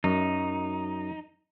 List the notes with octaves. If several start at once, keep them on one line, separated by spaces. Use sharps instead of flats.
F#2 D#4